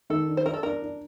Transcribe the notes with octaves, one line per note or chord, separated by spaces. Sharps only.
D#3 A4
D4
C5
D4 A#4
A4
D4 A#4
D4